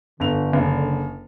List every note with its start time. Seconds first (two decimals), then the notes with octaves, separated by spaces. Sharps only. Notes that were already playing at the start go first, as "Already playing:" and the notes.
0.20 G1 D3 F7
0.53 F#1